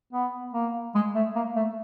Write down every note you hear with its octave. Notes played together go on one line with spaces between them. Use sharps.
B3
A#3
G#3
A3
A#3
A3